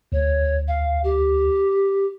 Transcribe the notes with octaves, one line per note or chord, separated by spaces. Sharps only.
D2 C#5
F5
G4